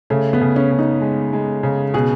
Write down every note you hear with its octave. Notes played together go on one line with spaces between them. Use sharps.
C#3 A3
B3
C#3
C#4
C#3
D#4
G#3
G#3
C#3
B2 G#4